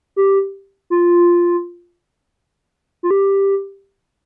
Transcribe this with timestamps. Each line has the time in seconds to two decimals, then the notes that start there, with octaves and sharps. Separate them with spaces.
0.16 G4
0.90 F4
3.03 F4
3.11 G4